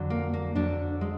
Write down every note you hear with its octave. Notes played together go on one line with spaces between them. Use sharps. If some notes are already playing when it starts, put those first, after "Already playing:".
Already playing: F2 D3 F#3
A#3
A#3
F2 D3 F#3 D4
G#3